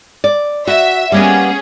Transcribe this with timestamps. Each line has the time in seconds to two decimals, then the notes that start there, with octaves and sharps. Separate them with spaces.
0.24 D5
0.67 F#4 E5
1.12 G3 A#3 B3 C#4 G#4